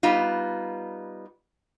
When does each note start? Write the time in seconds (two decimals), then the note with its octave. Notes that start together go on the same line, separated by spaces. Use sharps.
0.03 G3 B3 D#4 F4